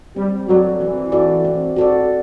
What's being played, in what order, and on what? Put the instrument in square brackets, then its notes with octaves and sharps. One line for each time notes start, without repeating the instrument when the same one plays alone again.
[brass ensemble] G3 [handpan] C4
[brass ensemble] F#3 [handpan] F#4 A4 D5
[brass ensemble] E3 [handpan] C4
[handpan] F#4 A4 D5
C4
F#4 A4 D5